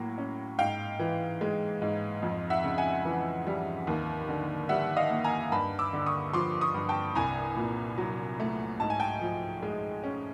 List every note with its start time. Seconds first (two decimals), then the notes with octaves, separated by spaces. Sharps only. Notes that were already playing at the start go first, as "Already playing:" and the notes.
Already playing: A2 F#3 A#3
0.18 C#4
0.59 G#2 F5 G5
0.99 E3
1.41 G#3
1.82 G#2
2.22 F2
2.50 E5 F#5
2.64 C#3
2.78 F#5 G#5
3.05 E3
3.47 G3
3.87 D#2
4.29 D3
4.69 G3 E5 F#5
4.96 D#5 F5
5.10 A#3
5.24 G#5 A#5
5.52 G2 A5 B5
5.79 D6 E6
5.93 D3
6.06 C#6 D#6
6.33 F3 C6 D6
6.61 C#6 D#6
6.74 G2
6.89 G5 A5
7.15 C2 G#5 A#5
7.56 A#2
7.98 F#3
8.40 A3
8.80 G#2 A5
8.90 G#5
9.00 G5 A5
9.21 F3
9.63 G#3
10.04 C#4